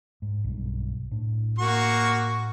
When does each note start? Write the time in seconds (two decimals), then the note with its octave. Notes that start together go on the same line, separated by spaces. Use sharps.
0.22 G#2
0.44 B1 G2
1.11 A2 D4
1.59 A#3 F#4 C#6